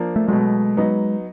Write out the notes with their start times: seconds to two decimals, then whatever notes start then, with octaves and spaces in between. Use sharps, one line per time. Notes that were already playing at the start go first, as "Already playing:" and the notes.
Already playing: F3 A#3 D4
0.16 A3
0.28 B2 F#3 G#3 A3
0.77 F#3 B3 D#4